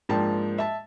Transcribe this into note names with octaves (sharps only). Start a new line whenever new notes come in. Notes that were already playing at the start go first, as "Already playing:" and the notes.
G#2 F3 A#3 D4 G5 A5
E5 A5